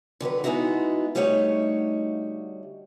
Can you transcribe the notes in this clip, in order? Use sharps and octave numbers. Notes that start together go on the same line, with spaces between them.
D3 D#3 F#3 B4
G#3 A#3 B3 D#4 E4 F#4
D2 G3 A3 D#4 C#5 F#5